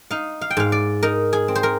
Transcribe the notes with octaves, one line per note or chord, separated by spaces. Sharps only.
D#4 F5
F5
G5
G#2 F5
D5
D#4 A#4
G#4
C4
C5
A#4